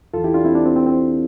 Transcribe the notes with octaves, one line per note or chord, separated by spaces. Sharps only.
E2 E3 F4 A4
E4 G4
D4 F4
C4 E4
D4
C4
C4
C4